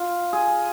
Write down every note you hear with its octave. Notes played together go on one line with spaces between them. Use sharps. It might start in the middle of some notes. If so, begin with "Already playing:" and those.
Already playing: F4
G#4